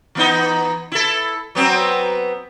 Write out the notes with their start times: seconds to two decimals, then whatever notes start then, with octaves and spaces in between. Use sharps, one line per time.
0.15 E3 B3 D#4
0.92 E4 A4
1.55 F#3 B3 C4